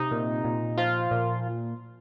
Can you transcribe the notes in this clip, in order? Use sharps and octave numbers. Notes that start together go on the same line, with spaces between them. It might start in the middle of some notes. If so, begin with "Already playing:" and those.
Already playing: C3 D#4
A#2
A#2
F3 F4
A#2